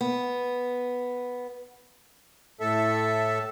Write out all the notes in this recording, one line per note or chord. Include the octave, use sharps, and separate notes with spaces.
B3
A2 A4 E5